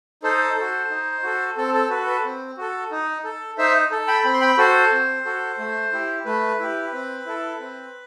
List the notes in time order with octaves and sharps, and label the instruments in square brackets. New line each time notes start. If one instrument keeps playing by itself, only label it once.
[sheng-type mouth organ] D#4 A4 C5
F#4 A4
D#4
F#4 A4
C4 A4
A4
F#4 A4 B4
B4
C4
F#4 A4
D#4
A4
D#4 C5 E5
A4
G5 B5
C4 B5
C6
G5 B5
F#4 A4 C5
C4
F#4 A4
A3
E4 G4
A3 B4
E4 G4
C4
E4 A4
C4